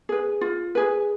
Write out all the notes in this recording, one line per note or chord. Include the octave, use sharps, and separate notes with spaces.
G#4 B4
F4
G#4 B4